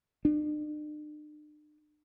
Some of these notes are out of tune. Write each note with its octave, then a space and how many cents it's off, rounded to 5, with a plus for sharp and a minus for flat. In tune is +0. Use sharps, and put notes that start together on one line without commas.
D4 +45